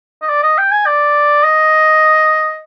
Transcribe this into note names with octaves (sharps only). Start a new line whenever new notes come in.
D#5
D5
D#5
G5
G#5
D5
D#5